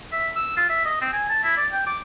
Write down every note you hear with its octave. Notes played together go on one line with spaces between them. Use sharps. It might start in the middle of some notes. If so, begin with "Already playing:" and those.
E5
E6
F4
E5
D#5
C4
G#5
A5
E4
D5
G5
D6